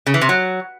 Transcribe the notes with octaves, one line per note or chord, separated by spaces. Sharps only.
C#3
E3
C3
F#3